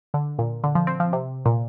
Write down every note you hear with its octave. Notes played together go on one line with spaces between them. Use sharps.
D3
A#2
D3
F3
C4
F3
C3
A#2